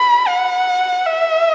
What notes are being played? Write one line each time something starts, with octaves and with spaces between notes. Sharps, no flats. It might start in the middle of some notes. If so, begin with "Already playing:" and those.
Already playing: B5
F#5
E5